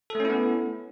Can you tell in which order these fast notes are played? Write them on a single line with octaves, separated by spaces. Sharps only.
A4 A3 C#4 E4 B3